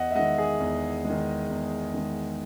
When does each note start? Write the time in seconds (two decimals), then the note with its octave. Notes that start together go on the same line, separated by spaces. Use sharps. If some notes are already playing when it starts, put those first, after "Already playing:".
Already playing: E2 D#5 F#5
0.11 E5
0.15 G#3 D#5 F#5
0.19 D#3
0.38 G#4
0.60 E2
1.04 G#3
1.10 D#3
1.49 E2
1.94 D#3 G#3